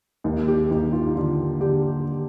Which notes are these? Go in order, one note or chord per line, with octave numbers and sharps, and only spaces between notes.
D#2 D#4
G4
D#2 D#4
F4
D#4
D3 F4
D3 G4